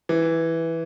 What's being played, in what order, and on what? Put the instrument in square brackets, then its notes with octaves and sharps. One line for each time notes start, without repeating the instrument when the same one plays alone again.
[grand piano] E3